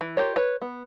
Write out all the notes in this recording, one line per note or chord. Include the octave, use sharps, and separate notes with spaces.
E3
F4 G4 A#4 C#5
B4 C#5
B3